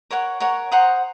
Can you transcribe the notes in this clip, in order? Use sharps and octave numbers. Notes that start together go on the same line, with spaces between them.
A#4 C#5 F#5 C#6
A#4 C#5 F#5 C#6
C5 F#5 A#5 D#6